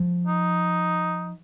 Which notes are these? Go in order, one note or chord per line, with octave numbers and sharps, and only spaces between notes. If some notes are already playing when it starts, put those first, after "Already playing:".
Already playing: F3
D#4